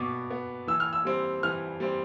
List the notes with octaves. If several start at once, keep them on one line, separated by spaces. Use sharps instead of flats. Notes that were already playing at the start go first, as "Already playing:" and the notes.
Already playing: B2 B3 D6
B3
E3 E6
F6
E6
G3 C4
E3 F6
G3 C4